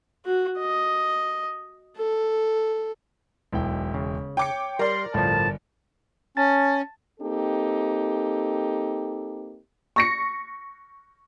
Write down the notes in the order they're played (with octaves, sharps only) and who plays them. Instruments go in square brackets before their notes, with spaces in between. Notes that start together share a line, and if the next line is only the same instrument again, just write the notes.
[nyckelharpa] F#4
D#5
A4
[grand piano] E1 E4 G5 [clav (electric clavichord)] B1
[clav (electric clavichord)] C#3
[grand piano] C#5 [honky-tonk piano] G5 D6 C#7
[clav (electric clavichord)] G3 [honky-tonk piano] A#4 D5 [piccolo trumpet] C6
[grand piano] G1 [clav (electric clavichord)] A2 F3 [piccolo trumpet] A5
[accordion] C#4 [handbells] A5 A6
[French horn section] A#3 C4 D#4 G4 A4
[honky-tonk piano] C#6 A#6 C#7